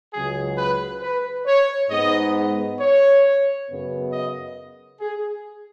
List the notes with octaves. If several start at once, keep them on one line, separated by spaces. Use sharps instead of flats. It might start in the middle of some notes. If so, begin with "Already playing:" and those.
C#2 C#3 F#3 G#4
B4
B4
C#5
G#2 G#3 B3 D#4 D#5
C#5
F#2 C#3 B3
D#5
G#4